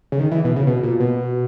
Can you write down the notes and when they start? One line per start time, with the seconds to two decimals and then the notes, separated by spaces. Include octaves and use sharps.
0.12 C#3
0.19 D#3
0.31 E3
0.44 B2
0.56 C#3
0.67 B2
0.83 A#2
1.00 B2